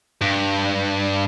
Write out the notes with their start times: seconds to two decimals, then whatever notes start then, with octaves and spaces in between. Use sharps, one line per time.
0.21 G2